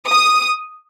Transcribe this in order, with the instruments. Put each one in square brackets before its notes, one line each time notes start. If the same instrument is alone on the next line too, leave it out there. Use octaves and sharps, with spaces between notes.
[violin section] D#6